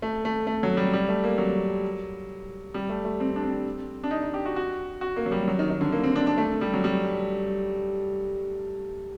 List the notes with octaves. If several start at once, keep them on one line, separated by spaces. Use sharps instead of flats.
A3
A3
A3
F#3
G3
G3
A3
A#3
F#3
G3
A3
A3
C4
D4
C4
D4
D#4
D#4
G4
F#4
F#4
F#4
A#3
F#3
G3
F#3
D#3
D#3
D3
A#3
C4
D4
D4
A3
G3
F#3
G3